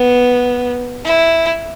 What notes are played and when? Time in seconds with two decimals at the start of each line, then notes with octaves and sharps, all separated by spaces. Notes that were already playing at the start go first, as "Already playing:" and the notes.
Already playing: B3
1.04 E4